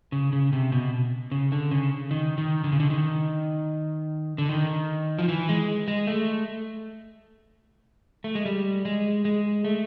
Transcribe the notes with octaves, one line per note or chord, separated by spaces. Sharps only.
C#3
C#3
C3
B2
C#3
D3
C#3
D#3
D#3
D3
C#3
D3
D#3
D3
D#3
F3
E3
G#3
G#3
A3
A3
G#3
G3
G#3
G#3
A3